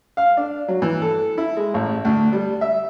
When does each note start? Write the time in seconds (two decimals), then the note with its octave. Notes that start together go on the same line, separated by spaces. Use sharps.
0.17 F5
0.37 D4
0.68 F#3
0.82 E3
1.02 A4
1.38 E4
1.57 G#3
1.74 A1
2.05 D2
2.33 G3
2.61 E5